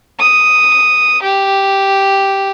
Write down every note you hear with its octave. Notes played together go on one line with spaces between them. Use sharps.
D#6
G4